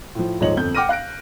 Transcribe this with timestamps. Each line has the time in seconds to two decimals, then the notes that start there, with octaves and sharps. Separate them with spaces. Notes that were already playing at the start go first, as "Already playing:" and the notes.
0.15 A2 F3
0.40 D#1 G#2 F3 C#5 D#5 F#7
0.56 G1 F2 A4 G6
0.75 F#5 G5 D6 F6 A#6 D#7
0.89 F5 F#6 A#6 D7